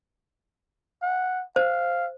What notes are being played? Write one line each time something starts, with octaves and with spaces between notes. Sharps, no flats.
F#5
C5 F5